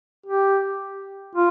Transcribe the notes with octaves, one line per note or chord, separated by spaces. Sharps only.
G4
F4